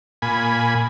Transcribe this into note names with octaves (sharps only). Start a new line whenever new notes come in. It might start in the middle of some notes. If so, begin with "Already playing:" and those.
A#2 G#5 B5